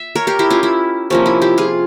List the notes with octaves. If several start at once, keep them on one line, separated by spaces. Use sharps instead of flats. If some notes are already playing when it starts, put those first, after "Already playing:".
Already playing: E5
A#4 C#5
G4 A#4
E4 G4
C#4 F4
E4
C3 F3 A#3 C#4
E4
E4 G4
F4 G#4